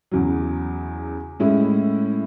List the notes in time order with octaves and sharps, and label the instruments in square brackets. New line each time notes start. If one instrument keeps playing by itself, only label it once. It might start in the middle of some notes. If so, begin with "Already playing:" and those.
[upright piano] E2 C#3 F#3
A2 G#3 C#4 E4